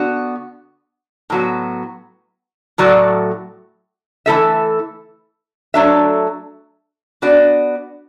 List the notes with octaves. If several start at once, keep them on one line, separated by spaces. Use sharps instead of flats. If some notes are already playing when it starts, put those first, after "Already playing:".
Already playing: D3 B3 F#4
A2 F#3 B3 F#4
A2 F#3 A3 F#4 D5
E3 A3 E4 A4 E5
F#3 A3 D4 A4 E5
B3 D4 F#4 D5